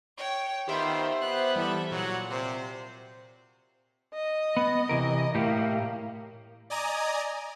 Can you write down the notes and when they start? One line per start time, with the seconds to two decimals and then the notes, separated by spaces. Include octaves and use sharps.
0.17 C#5 G5
0.68 D#3 B3 F4 G4 C5 E5
1.21 B3 F#6
1.56 E3 G3 A4 E5
1.91 A#2 F#3 F#4 F#5
2.30 C3 C5
4.14 D#5
4.57 B3
4.89 C3 E3 A#4
5.35 A2 A#3 G4
6.70 D5 D#5 G#5 A#5 D#6